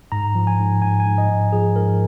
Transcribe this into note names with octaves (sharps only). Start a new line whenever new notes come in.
G#2 A#5
F3
G#5
G#2
G#2 G#5
G#5
G#2
D#5
G#2
F3 G#4
G#2 A#4